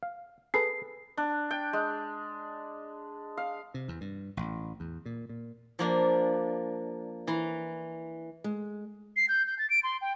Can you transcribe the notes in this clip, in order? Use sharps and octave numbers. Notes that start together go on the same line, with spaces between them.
F5
G#4 A4 B4 C7
D4
G5
G#3
F5
C3
E2
G2
A1
E2
A#2
A#2
F3 A#3 D4
E3 A#5 C6
G#3
C7
G6
G6
A6
D7
C6
G5